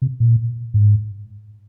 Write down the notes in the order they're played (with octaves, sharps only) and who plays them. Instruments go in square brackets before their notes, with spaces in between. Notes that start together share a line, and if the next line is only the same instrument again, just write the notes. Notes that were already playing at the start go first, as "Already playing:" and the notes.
[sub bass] C3
A#2
G#2